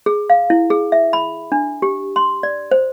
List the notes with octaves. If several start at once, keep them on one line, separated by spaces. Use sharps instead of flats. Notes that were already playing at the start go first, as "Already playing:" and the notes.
G#4
F5
E4
G#4
E5
B5
D4
G4
C6
D5
C5